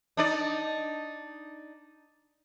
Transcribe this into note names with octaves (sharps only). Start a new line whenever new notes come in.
D4 D#4 D5